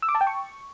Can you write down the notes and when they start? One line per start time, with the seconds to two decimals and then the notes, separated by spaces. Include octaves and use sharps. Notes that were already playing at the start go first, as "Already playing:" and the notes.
0.02 E6
0.09 D6
0.15 A5
0.21 G5
0.27 C#6